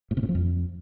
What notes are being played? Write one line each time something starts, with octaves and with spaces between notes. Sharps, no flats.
A2
C3
A2
F3
F2